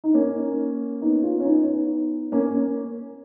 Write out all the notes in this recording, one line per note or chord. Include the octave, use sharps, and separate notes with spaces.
D#4
A#3 C#4
B3 D#4
C#4 F4
C#4
B3 D#4
A#3 C#4